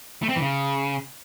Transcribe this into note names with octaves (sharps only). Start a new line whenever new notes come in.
A3
C4
E3
C#3